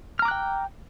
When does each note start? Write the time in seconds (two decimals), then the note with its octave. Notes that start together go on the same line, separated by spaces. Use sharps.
0.19 F6
0.22 A#5
0.25 D6
0.28 F#6
0.31 G5